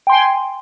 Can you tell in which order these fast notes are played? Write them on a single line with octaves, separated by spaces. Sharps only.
G5 C6 G#5